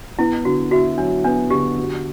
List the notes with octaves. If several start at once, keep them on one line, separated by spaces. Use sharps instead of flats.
B3 E4
D3 F#4
E4 F#4
F#3 D4
B3 D4
D3 G4
F#4